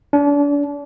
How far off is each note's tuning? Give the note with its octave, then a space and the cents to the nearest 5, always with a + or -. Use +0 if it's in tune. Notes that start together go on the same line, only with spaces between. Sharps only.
D4 -35